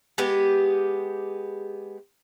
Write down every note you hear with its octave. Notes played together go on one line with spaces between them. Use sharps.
G#3 B3 G4